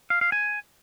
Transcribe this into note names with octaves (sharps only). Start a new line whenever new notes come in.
F5
F5
G#5